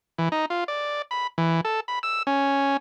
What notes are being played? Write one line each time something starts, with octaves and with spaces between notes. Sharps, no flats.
E3
D#4
F4
D5
B5
E3
A4
B5
E6
C#4